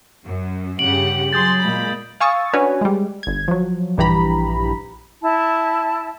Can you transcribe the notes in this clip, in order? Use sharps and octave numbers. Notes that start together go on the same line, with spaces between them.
F#2
G2 C#3 G4 F#5 D7 F#7
F#3 G#4 C6 D#6 G6 A6
A#2 G#3 A#3 B5
F5 G#5 C#6 D#6 E6 A6
C#4 D4 F#4 B4 C#5 G#5
G3 G#3
G1 G#6
F3 F#3
A#1 G2 E3 G4 A#5 B5
E4 A5